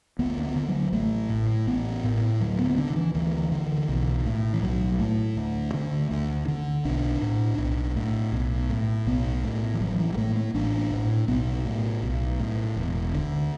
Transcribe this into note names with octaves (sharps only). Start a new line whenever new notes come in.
D2 B3
B3
D3
F#3
A1 A3
A2
A1 B3
A2
D2 F#3
B3
B3
D3 D4
D3
E3
D2 E3
D3
B1
A2
E3
B1 F#3
A2 A3
D2
D3
D2
D3
B1 D4
A2
B1
A2
B1
A2
B1 B3
A2
E3
A1 F#3
E3
F#3
A2 A3
A3
A1 D4
A2
B1 B3
A2
B1
A2
E1
D2 D3